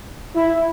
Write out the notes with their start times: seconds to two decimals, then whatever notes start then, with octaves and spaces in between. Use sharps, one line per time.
0.35 E4